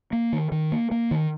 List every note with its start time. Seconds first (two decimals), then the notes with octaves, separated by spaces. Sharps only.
0.13 A#3
0.33 D#3
0.52 D#3
0.72 A#3
0.91 A#3
1.11 D#3